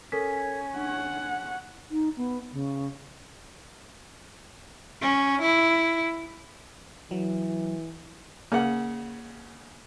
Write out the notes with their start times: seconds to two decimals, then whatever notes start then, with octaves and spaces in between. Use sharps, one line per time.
0.12 C#4 A4 A#4 B6
0.76 D4 F#5
1.91 D#4
2.17 B3
2.52 C#3
5.02 C#4
5.41 E4
7.11 E3 F#3
8.52 C#3 A#3 F#5